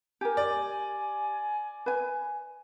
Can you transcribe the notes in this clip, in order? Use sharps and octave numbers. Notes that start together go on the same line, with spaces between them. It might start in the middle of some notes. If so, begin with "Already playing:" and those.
G4 A#4 G#5
D5
B4 G#5